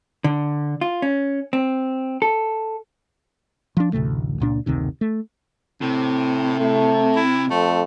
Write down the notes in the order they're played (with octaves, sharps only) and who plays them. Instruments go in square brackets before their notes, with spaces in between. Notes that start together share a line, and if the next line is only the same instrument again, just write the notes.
[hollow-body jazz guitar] D3
F4
C#4
C4
A4
[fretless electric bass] F3 D4
A1 D2 C3 A3
C#2 A#2 D4
F#1 D2 C3 D#3
A3
[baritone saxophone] A2 [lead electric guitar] C3
[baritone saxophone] A2 [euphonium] A3
[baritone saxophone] E4
[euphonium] F2 [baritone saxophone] A3